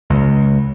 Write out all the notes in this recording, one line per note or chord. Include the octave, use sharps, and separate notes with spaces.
C#2